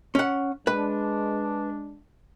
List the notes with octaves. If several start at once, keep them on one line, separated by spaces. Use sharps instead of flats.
C#4 F#5
G#3 D4 B4